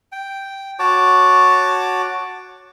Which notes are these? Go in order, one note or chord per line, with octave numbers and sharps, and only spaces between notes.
G5
F#4 C#5 A5 D6